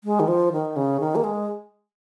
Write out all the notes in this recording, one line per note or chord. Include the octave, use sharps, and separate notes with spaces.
G#3
D#3
F3
D#3
C#3
D#3
A#3
G#3